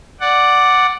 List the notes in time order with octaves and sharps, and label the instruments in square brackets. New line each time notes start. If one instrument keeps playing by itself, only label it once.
[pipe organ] D5 F#5